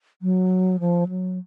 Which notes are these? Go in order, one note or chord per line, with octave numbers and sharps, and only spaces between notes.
F#3
F3
F#3